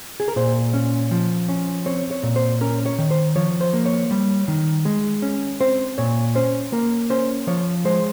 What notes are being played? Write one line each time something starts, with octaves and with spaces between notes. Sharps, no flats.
G#4
A#4
A#2 C5
C#4
F3
C#4
C4 C#5
C#5
A#2
C5
C#4 A#4
C#5
D#3
C5
F3 C#5
C5
A#3
C#5
G3
D#3
G#3
C#4
C4 C5
A#2 C#5
C#4 C5
A#3 A#4
C#4 C5
F3 C#5
G#3 C5